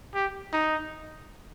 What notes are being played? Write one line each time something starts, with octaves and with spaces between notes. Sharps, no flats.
G4
D#4